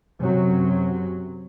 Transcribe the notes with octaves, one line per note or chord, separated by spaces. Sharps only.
F#2 C3 F#3